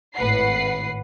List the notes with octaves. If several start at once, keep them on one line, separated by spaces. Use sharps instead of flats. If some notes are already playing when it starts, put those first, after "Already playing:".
G#1 A2 B4 F#5 C7